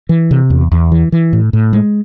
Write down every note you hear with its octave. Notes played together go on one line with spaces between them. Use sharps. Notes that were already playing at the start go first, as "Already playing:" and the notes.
E3
C3
E2
E2
E3
E3
A2
A2
G#3